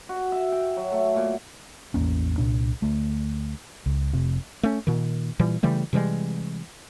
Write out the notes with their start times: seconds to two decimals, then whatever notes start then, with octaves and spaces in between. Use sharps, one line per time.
0.09 F#4
0.32 E5
0.52 G5
0.77 F#3
0.92 A3
1.16 A#2
1.94 A1 E2 A#3 C#4
2.38 C2 A#2 D4
2.82 D2 A3
3.86 C#2
4.13 F1 C3
4.63 A3 C#4
4.87 A#2 D#3
5.39 A#2 E3 G3
5.63 C#3 E3 G3 A3
5.93 C3 E3 G3 G#3